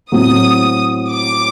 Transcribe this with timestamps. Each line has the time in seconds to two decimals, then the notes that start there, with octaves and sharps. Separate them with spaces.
0.12 A2 F#3 C4 D#6
1.12 D6